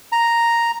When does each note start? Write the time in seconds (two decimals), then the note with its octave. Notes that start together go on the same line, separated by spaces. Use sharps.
0.12 A#5